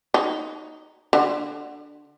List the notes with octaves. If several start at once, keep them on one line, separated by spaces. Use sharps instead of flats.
D#4
D3